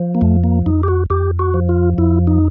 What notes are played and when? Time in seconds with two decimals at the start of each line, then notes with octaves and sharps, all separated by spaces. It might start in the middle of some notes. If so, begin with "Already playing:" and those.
Already playing: F3
0.15 A#3
0.21 F2 A3
0.44 A#3
0.66 F2 D#4
0.83 G4
0.88 F#4
1.10 F2 G4
1.39 F#4
1.54 F3
1.69 F4
1.98 F2 E4
2.27 D#4